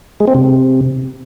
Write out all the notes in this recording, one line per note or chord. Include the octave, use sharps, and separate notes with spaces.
G#3
C4
C3